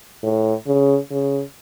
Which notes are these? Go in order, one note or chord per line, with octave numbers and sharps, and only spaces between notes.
A2
C#3
C#3